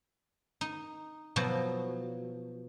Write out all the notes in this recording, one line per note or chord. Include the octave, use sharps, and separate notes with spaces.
D#4
B2 F3 F#3